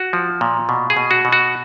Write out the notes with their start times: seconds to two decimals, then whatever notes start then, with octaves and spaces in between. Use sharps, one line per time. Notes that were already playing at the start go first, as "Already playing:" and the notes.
Already playing: F#4
0.13 F3
0.41 A#2
0.69 B2
0.90 G#4
0.97 B2
1.11 F#4
1.25 B2
1.32 F#4